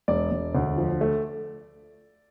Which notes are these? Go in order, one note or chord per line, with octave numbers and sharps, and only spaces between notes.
E1 D5
E1
D2
F3
A3